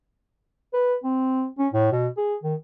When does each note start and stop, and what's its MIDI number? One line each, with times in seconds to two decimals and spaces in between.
0.73 0.95 71
1.04 1.46 60
1.59 1.68 61
1.73 1.88 45
1.92 2.08 47
2.17 2.35 68
2.43 2.55 51